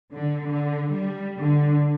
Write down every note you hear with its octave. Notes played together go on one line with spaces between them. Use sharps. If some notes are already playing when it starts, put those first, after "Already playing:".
D3
D3
G3
D3